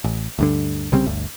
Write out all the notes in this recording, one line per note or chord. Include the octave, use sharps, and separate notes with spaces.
A1
D2 G2 D3
C2 C#3 G3 C4
G1 D2